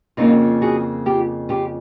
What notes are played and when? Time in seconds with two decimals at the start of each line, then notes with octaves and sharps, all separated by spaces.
0.17 F2 C#3 F3 A#3 D#4 F4
0.62 F#4 G#4
1.06 F4 G4
1.49 F4 G4